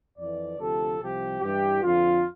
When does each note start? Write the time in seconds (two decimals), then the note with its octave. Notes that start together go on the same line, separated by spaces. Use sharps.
0.18 F2 E3 D5
0.59 D2 C3 F3 A4
1.00 C2 C3 F3 G4
1.41 G2 E3 G4
1.82 F2 D3 F3 F4